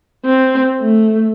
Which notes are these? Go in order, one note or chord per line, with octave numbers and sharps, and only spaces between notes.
C4
A3